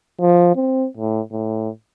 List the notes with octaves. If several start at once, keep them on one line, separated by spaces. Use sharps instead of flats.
F3
C4
A2
A2